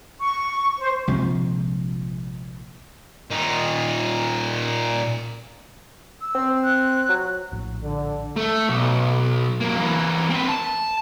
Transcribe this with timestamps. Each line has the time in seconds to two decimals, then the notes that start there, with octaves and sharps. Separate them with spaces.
0.19 C#6
0.78 C5
1.07 A#1 C3 F3 G#3
3.30 A#2 D#4
6.21 E6
6.35 C4
6.64 F#6
7.09 F#3
7.52 A#1 A2
7.82 D3
8.37 A3
8.69 B1
9.60 F#3 A#3
9.77 E3 A#3
10.30 C4 B4
10.48 A5